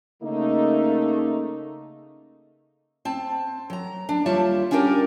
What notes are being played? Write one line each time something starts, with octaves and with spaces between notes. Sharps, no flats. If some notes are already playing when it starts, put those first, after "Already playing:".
C#3 A3 A#3 D#4
C4 A5
F#3 A#5
D4
D#2 G3 F4 C#5 E5 A5
C#4 D4 F4 G4 A#4